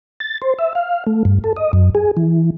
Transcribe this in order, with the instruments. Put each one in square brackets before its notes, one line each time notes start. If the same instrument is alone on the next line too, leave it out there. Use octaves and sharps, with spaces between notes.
[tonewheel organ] A6
C5
E5
F5
A3
G2
A4
D#5
F#2
G#4
E3